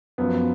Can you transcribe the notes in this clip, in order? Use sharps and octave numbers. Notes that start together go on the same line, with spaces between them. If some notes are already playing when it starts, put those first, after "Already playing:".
F#2 F3 B3